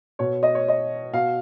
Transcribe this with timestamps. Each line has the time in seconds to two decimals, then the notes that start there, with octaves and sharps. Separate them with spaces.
0.19 B2 C#5
0.43 D#5
0.55 C#5
0.68 D#5
1.13 B2 F5